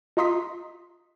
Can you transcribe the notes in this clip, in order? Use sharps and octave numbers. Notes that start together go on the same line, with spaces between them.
F4 D#5 A#5 C6 D#6 B6